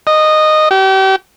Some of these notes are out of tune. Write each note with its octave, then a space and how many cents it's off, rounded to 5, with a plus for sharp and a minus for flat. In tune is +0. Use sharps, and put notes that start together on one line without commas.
D#5 -10
G4 -35